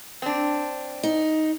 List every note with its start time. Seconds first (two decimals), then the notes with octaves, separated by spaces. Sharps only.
0.22 C4 D4
1.03 D#4